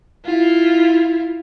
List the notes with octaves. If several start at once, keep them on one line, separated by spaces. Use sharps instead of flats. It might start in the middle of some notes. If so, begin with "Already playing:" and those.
E4 F4